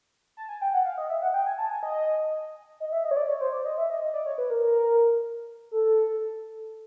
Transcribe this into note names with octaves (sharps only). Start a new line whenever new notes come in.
A5
G#5
G5
F#5
F5
D#5
E5
F#5
G5
G#5
A5
G#5
D#5
D#5
E5
D#5
C#5
D5
C#5
C5
D5
D#5
E5
D#5
D#5
D5
C#5
B4
A#4
A#4
A4